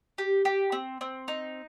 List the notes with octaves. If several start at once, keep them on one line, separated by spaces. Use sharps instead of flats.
G4
G4
C4
C4
D#4